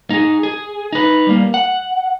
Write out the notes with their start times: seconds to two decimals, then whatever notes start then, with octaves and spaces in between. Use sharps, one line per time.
0.10 D#4 G#4
0.43 G#4
0.93 D#4 B4
1.27 G3 A#3
1.54 F#5